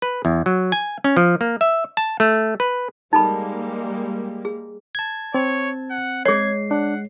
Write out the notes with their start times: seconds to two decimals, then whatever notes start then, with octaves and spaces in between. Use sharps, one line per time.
0.02 B4
0.25 E2
0.46 F#3
0.72 G#5
1.04 C#4
1.17 F3
1.41 A#3
1.61 E5
1.97 A5
2.20 A3
2.60 B4
3.13 G3 G#3 A#3 D#4 A4 B5
4.45 G#4
4.95 A5 G#6
5.34 C4 C#5
5.90 F#5
6.26 G#3 G#4 C#5 G#6 C7
6.71 D4 F#5